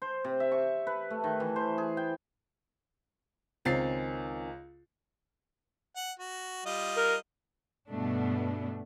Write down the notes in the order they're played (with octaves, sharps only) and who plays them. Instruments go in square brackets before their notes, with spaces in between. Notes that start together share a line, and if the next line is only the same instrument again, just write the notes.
[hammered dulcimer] C5
C3
E5
C#6
B4
A3
D#3
E3
C5
G#4
G5
[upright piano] C#2 A6 C7 [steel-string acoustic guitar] D#3 C4 C#4
[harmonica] F#5
F#4
G3 F4 D#5
[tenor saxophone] A#4
[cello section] G2 B2 A3 B3 D4